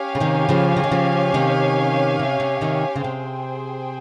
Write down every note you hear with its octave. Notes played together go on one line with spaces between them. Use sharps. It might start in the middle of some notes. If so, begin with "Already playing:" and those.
Already playing: C#4 G4 C#5 F5 G#5
C#3
C3 D#3
C#3 F3
C#3
D#3
C#3 F3
C3 D#3
C3
C3
C3 D#3
C#3
C3 G#4 C5 G5